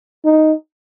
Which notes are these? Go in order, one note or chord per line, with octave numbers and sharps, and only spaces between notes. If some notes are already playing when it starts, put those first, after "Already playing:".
D#4